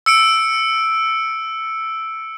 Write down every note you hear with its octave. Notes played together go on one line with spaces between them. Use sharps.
E6 C#7 D7